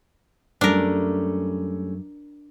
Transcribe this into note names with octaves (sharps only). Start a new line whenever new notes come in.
F#2 G3 A3 C#4 D4 A#4